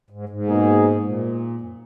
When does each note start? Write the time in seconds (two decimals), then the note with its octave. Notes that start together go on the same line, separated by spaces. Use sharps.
0.10 G#2
0.29 G#2
0.48 B2 A#3 D#4 G#4
1.04 A#2
1.61 F#2